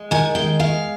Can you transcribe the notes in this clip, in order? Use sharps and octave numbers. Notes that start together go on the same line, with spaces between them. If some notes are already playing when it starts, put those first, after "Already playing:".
Already playing: G#3
D#3 G#5
G#3 G5
G#3 F5